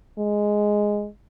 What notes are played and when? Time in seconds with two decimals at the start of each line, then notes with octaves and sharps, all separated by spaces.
0.19 G#3